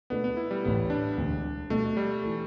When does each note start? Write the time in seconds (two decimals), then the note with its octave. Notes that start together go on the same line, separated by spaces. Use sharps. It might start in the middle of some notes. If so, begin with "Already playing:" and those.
0.10 B2 A3 B3 D4 B4 D5
0.24 B3
0.37 E4
0.51 G3
0.64 A1 A2 A3 B3 G4
0.90 D4
1.17 E1 D2 D3
1.70 B2 G3 A3 B3
1.97 G3
2.24 E3 A3